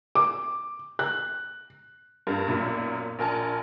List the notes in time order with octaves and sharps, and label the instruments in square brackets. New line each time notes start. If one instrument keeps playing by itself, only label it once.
[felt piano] D6
F#6
[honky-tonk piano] G2 A#4
B1 F#2 A#2
A#1 A#4 G#5 A5